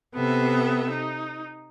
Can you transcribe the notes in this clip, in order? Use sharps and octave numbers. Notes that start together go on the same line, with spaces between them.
C3 B3 A4 E5
D#4